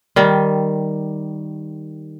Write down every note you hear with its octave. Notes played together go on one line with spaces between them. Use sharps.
D#3 G3